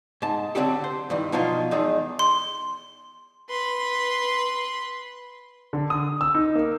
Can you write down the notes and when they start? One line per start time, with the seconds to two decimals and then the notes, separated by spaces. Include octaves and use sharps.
0.22 G#2 A5
0.55 D3 F#3 C4 D4 G4 A4
0.84 C5
1.10 G2 D#3 E3
1.32 B2 F3 F#3 D#4 F4
1.71 E2 G#3 D#4 A4
2.19 C6
3.49 B4 C6
5.73 D3
5.90 D#6
6.21 E6
6.35 D#4
6.55 A#3